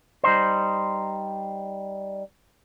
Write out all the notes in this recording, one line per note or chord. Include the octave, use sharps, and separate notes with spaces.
G3 D#4 C5